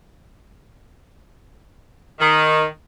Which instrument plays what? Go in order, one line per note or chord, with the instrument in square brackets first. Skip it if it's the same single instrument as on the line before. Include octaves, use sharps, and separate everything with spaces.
[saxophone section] D#3